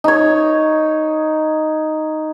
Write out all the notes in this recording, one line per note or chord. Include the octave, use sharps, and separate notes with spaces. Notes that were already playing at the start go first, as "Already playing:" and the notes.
D#4 C#5